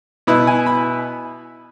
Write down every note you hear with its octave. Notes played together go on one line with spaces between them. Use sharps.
B2 B3 E4 B5
G#5
B5